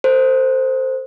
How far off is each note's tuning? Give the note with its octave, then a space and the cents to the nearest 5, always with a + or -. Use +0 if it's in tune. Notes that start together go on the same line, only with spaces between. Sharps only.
A4 +40 C5 +0